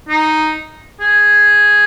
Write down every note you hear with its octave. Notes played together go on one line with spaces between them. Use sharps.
D#4
G#4